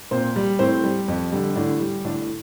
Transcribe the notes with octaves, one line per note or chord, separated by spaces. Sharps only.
A#2 C4 C5
G3
A2 C4 C5
G3
F2
D3 G3
A2 D3 D4
G3
A2 D3 D4